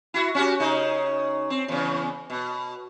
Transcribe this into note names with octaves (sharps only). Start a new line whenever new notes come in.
E4 F#4
C#4 F#4 G4
C#3 D#4
C4
E2 C#3
B2